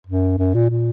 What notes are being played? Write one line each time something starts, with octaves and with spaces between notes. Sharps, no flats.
F#2
F#2
A#2
A#2